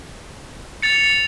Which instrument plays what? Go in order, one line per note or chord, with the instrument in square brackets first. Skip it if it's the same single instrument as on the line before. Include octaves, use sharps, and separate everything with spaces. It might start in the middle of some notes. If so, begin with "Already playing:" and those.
[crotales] A6 C#7 F7